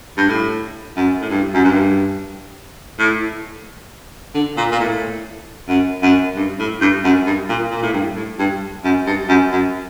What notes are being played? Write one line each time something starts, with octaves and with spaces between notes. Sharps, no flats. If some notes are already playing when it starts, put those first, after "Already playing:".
G2
A2
F#2
A2
G2
F#2
G2
A2
D3
A#2
A#2
A2
F#2
F#2
G2
A2
G2
F#2
G2
A#2
A#2
A2
G2
A2
G2
F#2
G2
F#2
F#2